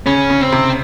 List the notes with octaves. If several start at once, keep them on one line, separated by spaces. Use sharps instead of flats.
C#3 C#4
C#3
C4
C3